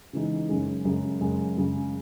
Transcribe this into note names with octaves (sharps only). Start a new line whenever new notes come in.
C#3 E3 G#3 D#4
F#2 C#3 G#3
F#2 C#3 G#3
F#2 C#3 G#3
F#2 C#3 G#3